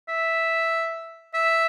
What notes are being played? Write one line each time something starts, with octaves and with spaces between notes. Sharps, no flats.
E5
E5